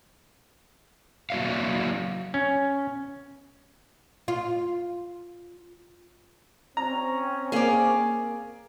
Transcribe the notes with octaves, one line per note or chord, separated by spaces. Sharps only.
F#3 A#3 F#4 D5 E5 F5
C#4
F4
C4 C#4 A#5
A#3 G#4 D5 F5